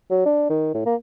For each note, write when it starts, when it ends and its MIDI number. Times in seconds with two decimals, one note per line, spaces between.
0.10 0.23 54
0.26 0.45 62
0.50 0.72 51
0.74 0.83 45
0.86 0.95 58